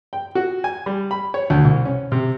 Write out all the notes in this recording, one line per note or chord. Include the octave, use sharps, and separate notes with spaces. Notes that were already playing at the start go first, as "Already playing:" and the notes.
G5
F#4
G#5
G3
B5
C#5
D2
C2
C#4
C3